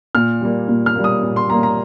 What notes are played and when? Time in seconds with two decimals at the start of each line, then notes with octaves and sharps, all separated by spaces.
0.15 A#2 F6
0.41 G3 A#3
0.68 A#2
0.86 F6
0.95 G3 A#3
1.04 D#6
1.23 A#2
1.36 C6
1.49 G3 A#3 A#5
1.63 A#5